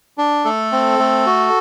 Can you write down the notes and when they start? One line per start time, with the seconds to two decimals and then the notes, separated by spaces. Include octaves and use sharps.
0.18 D4
0.45 A3 A4
0.72 C4
0.99 A3
1.26 F#4